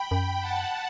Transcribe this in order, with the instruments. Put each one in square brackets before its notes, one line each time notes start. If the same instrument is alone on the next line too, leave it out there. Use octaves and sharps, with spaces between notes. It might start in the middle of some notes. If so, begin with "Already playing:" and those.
Already playing: [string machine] G5 B5
[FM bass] F#2
[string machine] F#5 A5